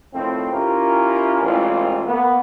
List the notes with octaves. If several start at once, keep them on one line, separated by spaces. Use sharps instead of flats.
A2 D#3 F3 C4
C#4 E4 F4 G4 A#4
A1 E2 E3 G#3 C4 F4
A#3 B3